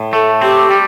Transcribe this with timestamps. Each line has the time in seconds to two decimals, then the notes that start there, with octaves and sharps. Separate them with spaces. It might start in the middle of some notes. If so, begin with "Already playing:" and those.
Already playing: A2
0.13 A3 A4
0.41 C4 G4
0.71 G3